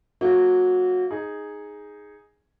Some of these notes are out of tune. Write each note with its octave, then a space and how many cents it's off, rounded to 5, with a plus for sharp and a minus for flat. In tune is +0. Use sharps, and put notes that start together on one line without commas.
F#3 -20 A#3 -35
D#4 +0 G#4 +0